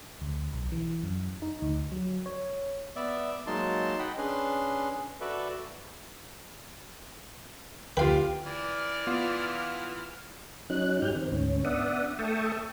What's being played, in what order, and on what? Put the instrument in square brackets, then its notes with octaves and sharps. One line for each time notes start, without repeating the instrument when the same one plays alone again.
[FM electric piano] D2
B1
E3
F#2
D#4
D2
F#3
C#5
[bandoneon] B3 D5 E5
F#3 G#3 A#3 D#4 A5 C6
D#5 F#5 G5 B5
C#4 D4 G#4 B4 C6
F#4 A4 B4 D5 E5
[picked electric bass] D2 [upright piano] F4 G4 G5 [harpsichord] B4 F5
[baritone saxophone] E3 [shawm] D5 [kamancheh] F6
[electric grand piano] B3 F4
[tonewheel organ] F#3 C#4 D#4 F#6
G2 G4 F6 G6
D#3 C4
D2 G#2 C#4
B3 D4 D5 E5 F#5 D#6
A3 E5 G5 A5 C#6 D#6